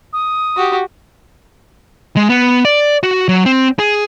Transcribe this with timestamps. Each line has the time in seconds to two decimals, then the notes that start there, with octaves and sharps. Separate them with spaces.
0.13 D#6
0.56 F#4 G4
2.16 G#3
2.29 B3
2.65 D5
3.03 F#4
3.28 F#3
3.46 C4
3.79 G#4